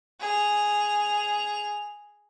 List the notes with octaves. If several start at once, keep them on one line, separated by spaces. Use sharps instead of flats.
G#4 F7